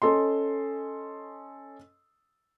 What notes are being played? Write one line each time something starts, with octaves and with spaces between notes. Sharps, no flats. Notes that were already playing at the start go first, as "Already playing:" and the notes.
C#4 A4 D#5 C6